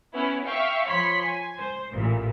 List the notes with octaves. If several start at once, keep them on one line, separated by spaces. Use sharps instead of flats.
B3 C#4 E4 B4
E5 F5 G5 C#6
F3 C#5 B5 C6 B6
G#5
C5
A1 A#2 E3